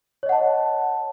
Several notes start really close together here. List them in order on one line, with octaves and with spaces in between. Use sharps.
C#5 D#5 F#5 A5